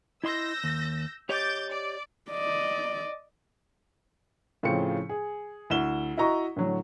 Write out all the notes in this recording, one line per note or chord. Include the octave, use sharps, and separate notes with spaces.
E4 D#5 C6 E6 G6 A#6
D#2
G4 C#5 D#5 D6 G6 A6
D5
D5 D#5
A2 C#3 F3 C4 C#7
G#4
D2 E4 E7 G7
E4 F#4 D#5 A#5 C#6
A2 D3 F#3